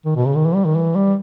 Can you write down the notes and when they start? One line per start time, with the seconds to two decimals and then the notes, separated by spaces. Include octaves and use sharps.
0.06 D#3
0.16 B2
0.26 C#3
0.36 D#3
0.46 E3
0.55 G3
0.65 D#3
0.75 E3
0.95 G3